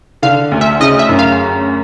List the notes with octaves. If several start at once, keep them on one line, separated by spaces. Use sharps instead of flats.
D3 F5
D2
E5
C#3 D#5
E5
F#2
F5